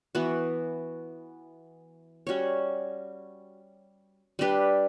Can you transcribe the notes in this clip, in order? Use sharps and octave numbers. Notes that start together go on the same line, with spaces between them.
E3 B3 F#4
G3 C#4 F#4 C#5
G3 D4 G4 B4